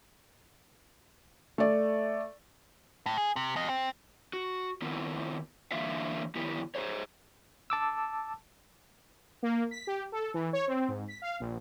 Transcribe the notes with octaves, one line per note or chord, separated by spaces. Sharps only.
A3 D5
A2
G#4
C3
F2 D#5
C4
F#4
D#3 B3 C4 E4 F4
D3 E3 A#3 F4 E5 F5
F2 D#3 B3 E4 G4
G#4 C5 C#5
A5 D6 E6
A#3
B6
G4
A4
E3
C#5
C4
G#2
B6
F5
A#1